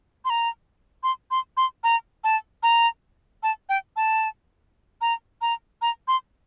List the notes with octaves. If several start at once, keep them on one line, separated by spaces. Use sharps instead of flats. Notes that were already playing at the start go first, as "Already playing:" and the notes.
C6
A#5
C6
C6
C6
A#5
A5
A#5
A5
G5
A5
A#5
A#5
A#5
C6